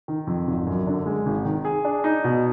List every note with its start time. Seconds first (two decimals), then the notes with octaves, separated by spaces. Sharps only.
0.08 D#3
0.27 F2
0.47 G#1
0.67 F#2
0.87 D3
1.06 G#3
1.26 G#1
1.45 D#3
1.65 G#4
1.85 D4
2.04 D#4
2.24 B2